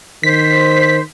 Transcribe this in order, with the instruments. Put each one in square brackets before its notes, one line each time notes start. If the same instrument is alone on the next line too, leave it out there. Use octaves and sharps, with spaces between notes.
[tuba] D#3 [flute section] C5 [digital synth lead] B6